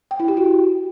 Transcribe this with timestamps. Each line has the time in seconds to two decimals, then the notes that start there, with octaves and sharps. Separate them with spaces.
0.11 G5
0.20 E4
0.28 G4
0.37 F#4